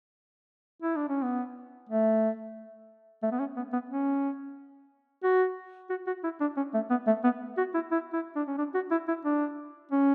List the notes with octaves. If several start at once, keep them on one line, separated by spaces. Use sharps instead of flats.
E4
D4
C#4
B3
A3
A3
B3
C#4
B3
B3
C#4
F#4
F#4
F#4
E4
D4
C#4
A3
B3
A3
B3
F#4
E4
E4
E4
D4
C#4
D4
F#4
E4
E4
D4
C#4